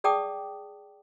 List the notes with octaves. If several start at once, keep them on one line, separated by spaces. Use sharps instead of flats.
G#4 D5 G5 A5 D6 D#6